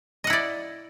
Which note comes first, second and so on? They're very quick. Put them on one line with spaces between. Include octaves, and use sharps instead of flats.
D#5 F#5 E4 D5